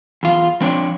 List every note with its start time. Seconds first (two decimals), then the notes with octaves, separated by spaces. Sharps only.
0.23 E2 F4
0.61 F3 C4 D4 C#5 D5